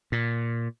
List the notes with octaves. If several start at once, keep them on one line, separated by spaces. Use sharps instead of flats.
A#2